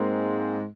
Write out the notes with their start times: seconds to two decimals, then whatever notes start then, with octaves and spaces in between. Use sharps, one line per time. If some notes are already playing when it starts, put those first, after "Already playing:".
Already playing: G#2 G#3 A#3 C4